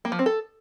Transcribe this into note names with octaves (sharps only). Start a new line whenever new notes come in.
A#3
F3
C4
A4